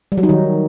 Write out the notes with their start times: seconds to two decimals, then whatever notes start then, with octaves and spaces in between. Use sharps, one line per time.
0.12 G3
0.18 F#3
0.23 D#4
0.29 D#3